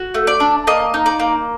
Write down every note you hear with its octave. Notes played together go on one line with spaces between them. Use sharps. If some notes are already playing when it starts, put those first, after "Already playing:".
Already playing: F#4
A3
D5
D4
A#3 D#5
D#4
D5
A#3